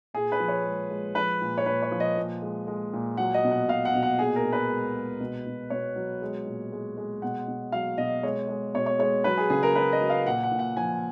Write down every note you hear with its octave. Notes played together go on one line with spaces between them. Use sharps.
A#2 G#4
B4
F3
C#5
G#3
G#3
F3 B4
A#2
C#5
A#2 B4
C#5
F3
D#5
A#2
G#3
G#3
A#2
F#3 F#5
D#5
B2
F#5
B2 F5
F#5
B2
F#5
A#2 G#4
A#4
A#2
B4
G#3
G#3
B2
B2
B2 C#5
F#3
G#3
A#2
G#3
G#3
B2 F#5
B2
F#3 F5
B2 D#5
G#3 C#5
G#3
B2 C#5
C#5
G#3 C#5
F#3 B4
G#4
C#3 G#4
A#4
F#3 B4
D#5
F#3
F5
A#2 F#5
F#5
A#2
F#5
F3 G#5